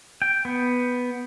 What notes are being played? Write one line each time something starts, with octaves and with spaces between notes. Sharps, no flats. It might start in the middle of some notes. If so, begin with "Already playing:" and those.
G5
B3